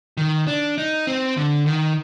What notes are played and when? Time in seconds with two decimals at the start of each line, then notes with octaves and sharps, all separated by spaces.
0.17 D#3
0.47 D4
0.78 D#4
1.07 C4
1.37 D3
1.66 D#3